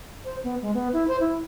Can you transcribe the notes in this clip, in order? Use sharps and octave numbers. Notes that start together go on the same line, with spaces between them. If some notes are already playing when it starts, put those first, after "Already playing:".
C5
B3
G#3
B3
E4
C5
E4